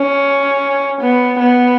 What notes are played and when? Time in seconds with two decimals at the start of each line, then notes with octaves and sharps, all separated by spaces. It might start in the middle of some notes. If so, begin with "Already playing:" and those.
Already playing: C#4
1.01 B3
1.40 B3